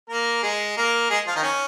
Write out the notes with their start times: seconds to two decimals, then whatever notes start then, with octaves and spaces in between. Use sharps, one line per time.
0.09 A#3 A#4
0.42 G#3 G#4
0.77 A#3 A#4
1.10 G#3 G#4
1.27 F3 F4
1.35 D#3 D#4
1.43 C#4